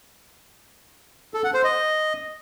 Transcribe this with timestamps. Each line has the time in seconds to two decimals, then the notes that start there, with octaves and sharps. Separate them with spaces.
1.34 A4
1.44 F#5
1.54 C5
1.64 D#5